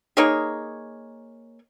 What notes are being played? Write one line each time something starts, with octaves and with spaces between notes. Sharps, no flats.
A#3 D#4 G#4 C#5